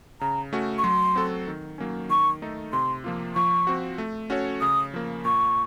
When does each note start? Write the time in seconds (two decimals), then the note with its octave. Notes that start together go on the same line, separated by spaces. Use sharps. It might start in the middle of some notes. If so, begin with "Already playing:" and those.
0.21 C#3 A#5
0.53 A3 C#4 F#4
0.78 C#6
0.84 F#3 C6
1.15 C4 F#4 A4
1.47 D#3
1.78 F#3 A#3 C#4
2.09 D#3 C#6
2.42 A3 D#4 A4
2.73 C3 C6
3.04 F3 A#3 F4
3.35 F3 C#6
3.67 C4 F#4
3.98 A3
4.30 C#4 F#4 A4 C#5
4.61 C#3 D#6
4.94 F3 A#3
5.25 A#2 C#6